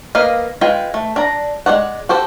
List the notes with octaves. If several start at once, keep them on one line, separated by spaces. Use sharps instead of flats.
A#3 B4 D#5 F5
G#3 F4 B4 G5
A3
D4 A#5
G#3 F4 D5 F#5
F#4 G4 A4 C5